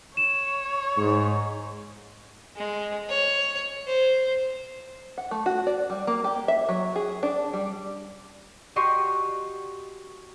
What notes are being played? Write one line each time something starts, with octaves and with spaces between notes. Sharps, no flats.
C#5 E7
G#2
G#3
C#5
C5
F#5
A3
F#4
D5
G3
A#3
G4
E5
F#3
G#4
D4
G3
F#4 G4 D#5 C6 C#6